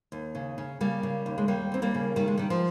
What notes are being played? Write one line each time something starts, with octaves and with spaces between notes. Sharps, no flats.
D#2
C#3
C#3
C#3 G3 A#3
C#3
D#2
G#3
D#2 G3 A#3
D#2 C4
G3 A#3
C#3
D#3 G3
G#3
D#3 G3
F3